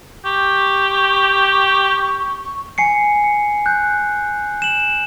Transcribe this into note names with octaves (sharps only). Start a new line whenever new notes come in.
G4 C#6
G#5 C7 C#7
C#7
F#6 G6
E7 F#7